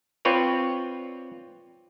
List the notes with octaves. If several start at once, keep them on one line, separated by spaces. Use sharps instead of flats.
C4 F4 B4 C#5 D5